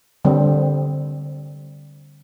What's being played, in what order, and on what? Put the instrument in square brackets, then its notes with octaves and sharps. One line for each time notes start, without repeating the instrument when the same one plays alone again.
[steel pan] D3 G3 C4